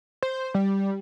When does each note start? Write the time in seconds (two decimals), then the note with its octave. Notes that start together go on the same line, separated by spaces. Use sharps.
0.23 C5
0.54 G3